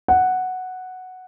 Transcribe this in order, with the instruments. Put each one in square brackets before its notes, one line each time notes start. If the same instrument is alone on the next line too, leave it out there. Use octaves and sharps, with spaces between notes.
[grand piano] F#5